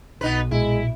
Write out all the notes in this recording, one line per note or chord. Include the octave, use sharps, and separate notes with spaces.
B1 B3 D#4 B4
A#2 G#3 E4